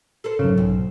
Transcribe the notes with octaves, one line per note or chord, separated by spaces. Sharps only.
A4 A#4 C5
F1 A#1 G#2 C#3 F#3
B1 C4